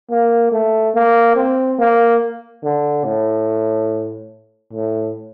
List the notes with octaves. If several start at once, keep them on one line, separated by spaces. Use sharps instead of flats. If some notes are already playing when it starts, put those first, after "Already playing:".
A#3
A3
A#3
C4
A#3
D3
A2
A2